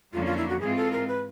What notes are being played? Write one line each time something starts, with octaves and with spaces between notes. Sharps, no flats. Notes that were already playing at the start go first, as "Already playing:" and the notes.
F2 D3 F#3 A#3 C#4 F4
F4
E4
F#4
G#2 E3 G#3 C4 F4 G#4
A4
A#4
B4